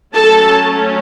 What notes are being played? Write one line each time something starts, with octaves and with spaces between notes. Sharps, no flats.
F#3 A3 C#4 A4 A5